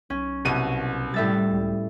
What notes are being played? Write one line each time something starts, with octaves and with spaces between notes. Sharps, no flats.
B1 C#4
C2 B2 D#7
A2 G3 E5 A6
C#2